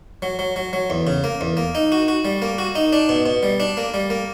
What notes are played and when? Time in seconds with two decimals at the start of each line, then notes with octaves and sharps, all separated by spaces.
0.22 F#3
0.39 F#3
0.56 F#3
0.73 F#3
0.90 E2
1.07 C#3
1.24 A#3
1.41 E2
1.57 A#3
1.75 D#4
1.92 F#4
2.08 F#4
2.25 G3
2.42 A#3
2.58 F#4
2.75 D#4
2.93 D4
3.09 B2
3.26 B2
3.43 G3
3.60 D4
3.77 A#3
3.94 G3
4.10 A#3